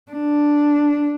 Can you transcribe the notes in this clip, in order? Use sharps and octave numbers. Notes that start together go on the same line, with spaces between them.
D4